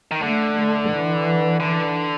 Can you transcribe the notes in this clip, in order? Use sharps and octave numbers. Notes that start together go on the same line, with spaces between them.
D#3
D3 A3
A3
E3
D3